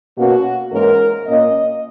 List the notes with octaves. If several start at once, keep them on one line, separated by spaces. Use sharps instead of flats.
B2 A#3 C#4 F#4
G#2 E3 A#3 C#4 A#4
A#2 A#3 C#4 D#5